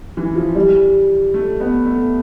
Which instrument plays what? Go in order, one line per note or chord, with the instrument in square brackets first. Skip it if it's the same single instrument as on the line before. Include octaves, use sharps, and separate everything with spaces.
[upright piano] E3
F3
G3
A3
B3
A3